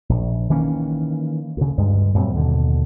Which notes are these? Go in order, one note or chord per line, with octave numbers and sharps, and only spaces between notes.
A#1
D#3 E3 A#3 C#4
D2 C#3
D2 G2 G#3
F#2 A#2 G3 C4
D#2 B2 D3